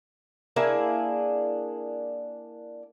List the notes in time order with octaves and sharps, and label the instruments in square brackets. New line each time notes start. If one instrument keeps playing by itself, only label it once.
[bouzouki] A#3 D4 E4 G#4